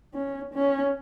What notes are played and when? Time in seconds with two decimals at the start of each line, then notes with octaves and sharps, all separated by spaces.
0.14 C#4
0.54 C#4